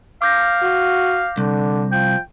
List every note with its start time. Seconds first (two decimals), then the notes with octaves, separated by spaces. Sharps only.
0.22 F5 D6 G6 A#6
0.63 F#4
1.38 C2 D3
1.92 F3 G5